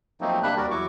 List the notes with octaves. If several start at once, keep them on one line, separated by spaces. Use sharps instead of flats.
F3 F#3 A3 A#3 C4 D#4
C3 G3 A#3 D4 B5 F#6
D#2 G3 F#4 A#4 D5
E2 F#3 E4 F#4 C#6 D6